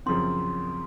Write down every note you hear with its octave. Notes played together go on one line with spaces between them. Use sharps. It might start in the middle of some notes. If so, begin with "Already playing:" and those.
F#2 C#3 F3 C4 C6